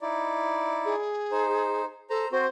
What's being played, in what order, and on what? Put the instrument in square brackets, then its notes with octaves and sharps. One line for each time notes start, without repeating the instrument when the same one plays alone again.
[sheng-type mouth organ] D#4 E4 D5
[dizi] G#4
[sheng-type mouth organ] D#4 C5
[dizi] A4 [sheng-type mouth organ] C5 A#5
[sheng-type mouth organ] C4 F#4 [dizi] C5